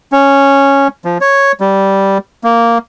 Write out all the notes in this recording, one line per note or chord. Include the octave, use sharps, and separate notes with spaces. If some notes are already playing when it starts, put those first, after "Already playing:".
C#4
F3
C#5
G3
A#3